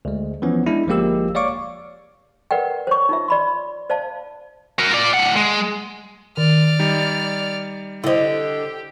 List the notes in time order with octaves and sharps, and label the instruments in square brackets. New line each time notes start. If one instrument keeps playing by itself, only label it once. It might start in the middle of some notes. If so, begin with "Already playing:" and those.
[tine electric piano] D2 G#3
E3 F3 B3 C#4
G#3 D4 E4
G1 F3 G#3 A#3 G4 E6
C#5 D5 F5 C#6 D6
[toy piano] A#4 B4 D5 F#5 G5
C5 C#5 C#6
D#4 F4 E5
D5 B5 C6
C5 D5 F5 A5
[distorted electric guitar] F#4 A#4
F4 D5
A2 F#5
G#3
[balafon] D#3 [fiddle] D5 F6
[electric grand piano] G3 D#4
[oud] D3 D#5 [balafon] E4 C5 [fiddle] G4